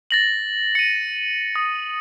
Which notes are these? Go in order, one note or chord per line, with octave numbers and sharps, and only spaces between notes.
A6 A#6 F#7
C#7 D#7
D#6